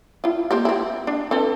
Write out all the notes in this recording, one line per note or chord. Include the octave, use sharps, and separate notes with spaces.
E4 F4
A#3 C4 G4
C4 E4
D4
C4 A4 B4